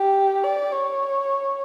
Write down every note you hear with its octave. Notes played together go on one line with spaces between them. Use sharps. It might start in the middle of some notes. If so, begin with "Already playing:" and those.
Already playing: G4
D5
C#5